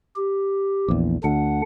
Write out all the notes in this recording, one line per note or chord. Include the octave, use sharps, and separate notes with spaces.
G4
A#1 E2
D2 D3 D4 F#5